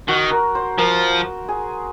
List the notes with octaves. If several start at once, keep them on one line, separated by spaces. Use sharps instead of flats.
D#3 F#4
A#4
C5
F3 A#4
G#4